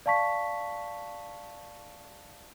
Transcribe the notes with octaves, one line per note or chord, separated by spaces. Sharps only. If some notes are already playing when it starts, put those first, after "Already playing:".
D5 F5 A5 C#6 B6